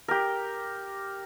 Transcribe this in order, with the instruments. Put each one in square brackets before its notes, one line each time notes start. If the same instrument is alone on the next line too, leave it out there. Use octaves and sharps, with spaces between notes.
[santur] G4 A#4